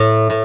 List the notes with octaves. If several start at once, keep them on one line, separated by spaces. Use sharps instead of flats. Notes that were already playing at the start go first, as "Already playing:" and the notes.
Already playing: A2
A2